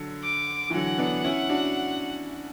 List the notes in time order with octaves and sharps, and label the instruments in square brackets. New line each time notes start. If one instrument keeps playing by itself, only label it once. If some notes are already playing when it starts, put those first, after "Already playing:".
Already playing: [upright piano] D3 F#3
[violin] D6
[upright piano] E3
[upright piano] D3 F#3 [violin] F#5
[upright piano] B3 D4
C#4 E4
D4 F#4